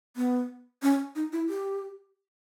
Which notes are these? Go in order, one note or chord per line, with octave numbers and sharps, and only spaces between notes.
B3
C#4
D#4
E4
G4